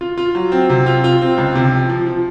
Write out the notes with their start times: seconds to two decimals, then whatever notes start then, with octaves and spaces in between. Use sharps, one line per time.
0.01 F4
0.18 F4
0.35 F#3
0.52 C4
0.69 C3
0.86 F4
1.04 F4
1.21 C4
1.38 C#2
1.55 C3
1.72 F3
1.89 F3
2.06 F3